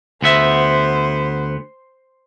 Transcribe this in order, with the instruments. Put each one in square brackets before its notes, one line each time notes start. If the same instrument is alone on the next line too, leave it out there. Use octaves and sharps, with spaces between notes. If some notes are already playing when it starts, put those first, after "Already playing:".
[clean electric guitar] D2 B3 E5 [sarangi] C5